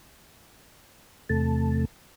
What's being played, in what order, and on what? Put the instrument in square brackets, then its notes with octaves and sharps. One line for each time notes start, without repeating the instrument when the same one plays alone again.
[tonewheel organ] E2 C3 A3 A5